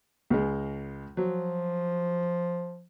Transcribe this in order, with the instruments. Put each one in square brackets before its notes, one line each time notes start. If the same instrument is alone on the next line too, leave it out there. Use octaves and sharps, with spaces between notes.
[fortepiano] C#2 G#3
[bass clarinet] F3 [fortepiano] F#3